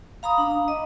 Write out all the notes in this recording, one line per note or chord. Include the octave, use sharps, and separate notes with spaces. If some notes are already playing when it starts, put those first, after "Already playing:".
F5 A#5 B5 D#6
D4
D#5